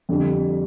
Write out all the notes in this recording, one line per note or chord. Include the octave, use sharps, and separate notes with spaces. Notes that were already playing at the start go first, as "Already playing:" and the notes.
F2 D3 G3